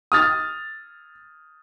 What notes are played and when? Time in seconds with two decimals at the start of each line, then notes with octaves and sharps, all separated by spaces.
0.12 D#6 F6 A6